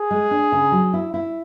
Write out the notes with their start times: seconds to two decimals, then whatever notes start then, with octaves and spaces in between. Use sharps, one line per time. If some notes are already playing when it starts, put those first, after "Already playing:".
Already playing: G#4
0.11 G#3
0.31 D4
0.52 C#3
0.72 F#3
0.94 E4
1.14 E4